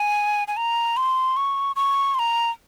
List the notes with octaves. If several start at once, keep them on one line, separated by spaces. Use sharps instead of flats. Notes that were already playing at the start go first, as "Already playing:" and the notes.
Already playing: G#5
G#5
A#5
C6
C#6
C#6
C6
A#5